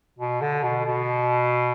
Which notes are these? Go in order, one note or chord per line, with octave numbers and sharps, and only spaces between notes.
B2
D3
B2
B2